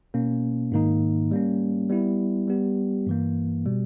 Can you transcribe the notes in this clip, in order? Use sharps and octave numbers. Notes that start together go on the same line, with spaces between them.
B2 A#3 C#4
G#2 D#3 A#3 D#4
G3 A#3 C#4
G3 B3 E4
G3 B3 G4
G2 E3 A#3
B2 G3